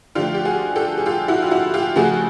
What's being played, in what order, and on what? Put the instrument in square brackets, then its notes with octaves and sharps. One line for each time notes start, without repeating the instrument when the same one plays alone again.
[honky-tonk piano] D3 F3 A3 F4 G4
G4
F#4 G#4
G4 A4
G#4
F4 G4
E4 F#4
F4
E4 F#4
F4 G4
C#3 F3 A3 F#4 G#4